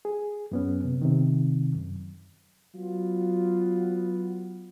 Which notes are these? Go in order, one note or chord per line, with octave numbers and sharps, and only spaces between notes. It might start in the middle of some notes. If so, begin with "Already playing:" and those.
G#4
F#2 B3 C#4
C3
C3 D#3
F#2
F#3 B3 F4